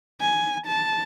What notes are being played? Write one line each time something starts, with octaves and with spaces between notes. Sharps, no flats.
G#5
A5